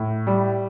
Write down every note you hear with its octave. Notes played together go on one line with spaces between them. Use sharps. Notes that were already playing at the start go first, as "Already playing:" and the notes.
Already playing: A2
G3